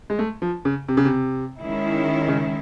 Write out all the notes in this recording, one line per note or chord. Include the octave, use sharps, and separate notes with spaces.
G#3
A3
F3
C#3
C3
C#3
C3
D#3 G#3 C#4 E4
C#3